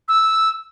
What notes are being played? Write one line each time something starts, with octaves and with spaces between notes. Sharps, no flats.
E6